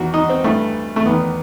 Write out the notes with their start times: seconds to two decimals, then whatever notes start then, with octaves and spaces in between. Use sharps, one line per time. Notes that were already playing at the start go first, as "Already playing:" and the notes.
Already playing: E2 D#3 F#4
0.14 D#4
0.29 C4
0.44 G2 E3 A3
0.96 A3
1.06 E2 D#3 B3